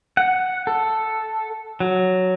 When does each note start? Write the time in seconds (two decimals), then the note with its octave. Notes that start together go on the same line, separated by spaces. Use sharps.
0.17 F#5
0.67 A4
1.80 F#3